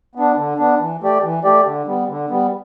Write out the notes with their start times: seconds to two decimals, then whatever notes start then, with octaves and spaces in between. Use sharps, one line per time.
0.15 B3 D4
0.37 D3
0.58 B3 D4
0.79 E3
1.01 A3 G4 D5
1.23 E3
1.44 A3 G4 D5
1.65 D3
1.87 G3 B3
2.08 D3
2.30 G3 B3